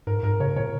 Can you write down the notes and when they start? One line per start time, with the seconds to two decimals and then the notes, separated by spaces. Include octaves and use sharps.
0.07 G#2 A#4
0.23 G#2 A#4
0.40 C#3 C#5
0.56 A#2 C#5